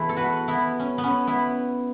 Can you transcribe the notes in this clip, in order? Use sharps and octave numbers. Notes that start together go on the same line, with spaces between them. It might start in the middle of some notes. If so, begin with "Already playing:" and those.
Already playing: E2 E3 A3 E4
A4
F#4 B4
B3 E4
C#4
B3
C#4
B3 E4